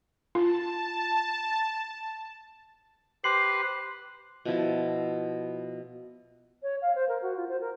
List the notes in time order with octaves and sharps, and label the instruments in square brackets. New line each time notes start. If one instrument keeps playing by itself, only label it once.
[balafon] F4 [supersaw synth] A5
[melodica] G4 B4 C5 [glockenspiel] C7 F#7
[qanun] B2 F3 E4 A5
[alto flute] C#5
F5
C5
A#4
F#4
F4
C5
A#4